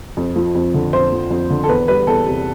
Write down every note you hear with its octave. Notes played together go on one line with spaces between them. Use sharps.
F2
F3
F2
D3
F2 C5
F3
F2
D3
A4
E2 B4
G3 B4
E2 A4
C3